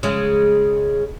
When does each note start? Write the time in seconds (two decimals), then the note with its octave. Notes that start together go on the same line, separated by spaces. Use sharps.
0.03 C#3 G#3